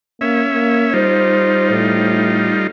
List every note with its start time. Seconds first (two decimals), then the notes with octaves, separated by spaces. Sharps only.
0.21 A#3 C#4 E5
0.53 A#3
0.93 G3 D#4 F4 C5
1.71 A2